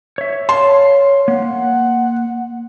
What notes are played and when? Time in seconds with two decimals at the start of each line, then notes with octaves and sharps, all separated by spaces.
0.18 C#5 E5
0.49 C#5 F5 A5 C6
1.28 A#3 F#5